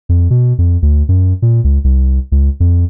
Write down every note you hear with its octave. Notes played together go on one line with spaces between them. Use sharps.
F2
B2
F2
D2
F#2
A#2
C#2
C2
C#2
F2